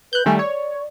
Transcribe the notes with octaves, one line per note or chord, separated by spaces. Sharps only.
B4 F#6 G6
D#3 G3 A3 G#5
C#5 D5